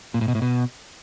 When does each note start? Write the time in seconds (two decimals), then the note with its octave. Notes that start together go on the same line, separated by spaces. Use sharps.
0.14 A#2
0.21 A2
0.28 B2
0.35 A2
0.42 B2